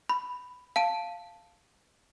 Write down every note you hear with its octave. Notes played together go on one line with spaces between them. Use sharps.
B5
F5 A5 D7